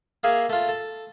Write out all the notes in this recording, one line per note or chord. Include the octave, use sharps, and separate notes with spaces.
A#3 G#4 E5 F5
A3 F4
A4